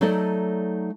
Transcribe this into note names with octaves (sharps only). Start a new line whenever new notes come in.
F#3 A3 D#4 A4 D5 D#5